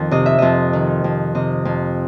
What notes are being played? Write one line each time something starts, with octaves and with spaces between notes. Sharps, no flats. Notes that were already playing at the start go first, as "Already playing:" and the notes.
Already playing: F2 D#3
C3 D#5
E5
F2 D#5
D#3
F2
C3 D#5
F2